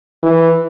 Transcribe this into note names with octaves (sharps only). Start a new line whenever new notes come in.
E3